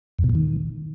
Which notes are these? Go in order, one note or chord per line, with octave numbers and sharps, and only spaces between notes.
F2
B2
A#2
D#3